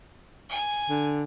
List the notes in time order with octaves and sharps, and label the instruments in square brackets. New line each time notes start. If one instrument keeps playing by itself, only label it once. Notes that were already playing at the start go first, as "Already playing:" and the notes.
[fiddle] G#5
[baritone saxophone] D3